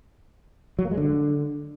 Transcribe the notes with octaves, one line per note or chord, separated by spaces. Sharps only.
F#3
A#3
G#3
D3